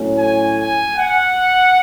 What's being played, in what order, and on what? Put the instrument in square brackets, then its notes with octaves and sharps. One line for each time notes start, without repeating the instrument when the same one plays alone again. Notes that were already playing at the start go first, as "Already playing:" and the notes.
Already playing: [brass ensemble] A2 F#3 C#4
G#5
G#5
F#5